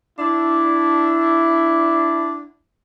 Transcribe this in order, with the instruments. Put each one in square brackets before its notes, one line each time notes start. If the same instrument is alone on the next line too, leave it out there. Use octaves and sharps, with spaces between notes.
[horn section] D4 E4